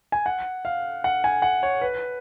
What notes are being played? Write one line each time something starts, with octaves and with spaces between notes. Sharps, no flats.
G#5
F#5
F5
F#5
G#5
F#5
C#5
B4